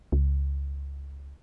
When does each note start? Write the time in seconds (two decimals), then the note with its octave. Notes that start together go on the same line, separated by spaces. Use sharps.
0.12 C#2